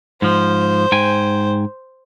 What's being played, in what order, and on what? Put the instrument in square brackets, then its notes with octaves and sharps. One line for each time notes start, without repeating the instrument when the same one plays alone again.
[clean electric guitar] G#2 F3 [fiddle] C5
[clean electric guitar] G#2 G5 G#5